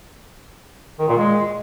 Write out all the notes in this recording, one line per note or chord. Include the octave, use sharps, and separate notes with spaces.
D#3
A#2
G#3